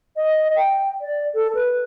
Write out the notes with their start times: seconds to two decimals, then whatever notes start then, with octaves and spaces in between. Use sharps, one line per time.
0.17 D#5
0.56 G5
1.01 D5
1.35 A4
1.55 B4